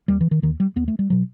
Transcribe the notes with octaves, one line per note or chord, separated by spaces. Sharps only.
D#2 G3
E3
D#3
D#2 D#3
G3
D#2 B3
A3
G3
B2 F#3